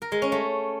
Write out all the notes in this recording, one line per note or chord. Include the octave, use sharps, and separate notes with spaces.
A#4
G#3
C#4
A3